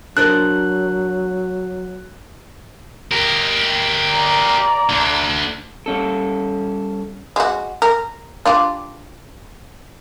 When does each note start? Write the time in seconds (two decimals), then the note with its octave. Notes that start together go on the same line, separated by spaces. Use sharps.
0.17 F#3 D4 A#4 C5 F#6
3.11 G4 A#4
4.12 D5 A#5
4.90 D2 D3
5.86 G3 C#4 A4
7.36 G#3 F#4
7.82 A#4
8.45 D4 F4 G4